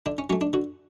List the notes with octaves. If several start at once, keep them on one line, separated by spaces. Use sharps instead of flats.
D3 D4
C#4
F#3 A3 C#4
D4
D3 F#4